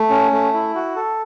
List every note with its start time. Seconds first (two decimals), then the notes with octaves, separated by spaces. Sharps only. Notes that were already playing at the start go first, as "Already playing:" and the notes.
Already playing: A3
0.10 C#4
0.32 A3
0.53 E4
0.75 F#4
0.96 A4